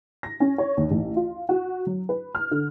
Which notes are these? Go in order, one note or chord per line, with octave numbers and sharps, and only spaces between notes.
A#6
C#4
C#5
D#2
A1
F4
F#4
F#3
B4
F6
D3